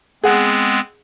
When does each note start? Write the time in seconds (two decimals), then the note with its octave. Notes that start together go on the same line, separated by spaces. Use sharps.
0.24 G#3 B3 C4 G#4 F#5